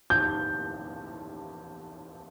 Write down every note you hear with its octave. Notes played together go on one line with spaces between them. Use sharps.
G6